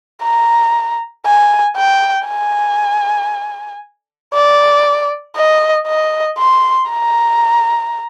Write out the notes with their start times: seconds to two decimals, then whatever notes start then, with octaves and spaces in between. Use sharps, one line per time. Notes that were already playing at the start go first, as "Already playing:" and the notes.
0.23 A#5
1.26 G#5
1.77 G5
2.27 G#5
4.34 D5
5.36 D#5
5.87 D#5
6.39 C6
6.91 A#5